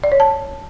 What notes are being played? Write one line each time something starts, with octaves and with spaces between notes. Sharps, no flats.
D5
C#5
A5